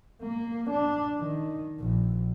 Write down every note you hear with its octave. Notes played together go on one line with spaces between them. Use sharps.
A#3
D4
D#3
A#1